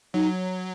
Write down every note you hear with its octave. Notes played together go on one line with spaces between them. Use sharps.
F#3 D#4